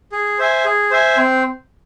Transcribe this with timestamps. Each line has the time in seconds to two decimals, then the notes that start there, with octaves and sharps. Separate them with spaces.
0.12 G#4
0.38 C5 E5 G#5
0.65 G#4
0.91 C5 E5 G#5
1.17 C4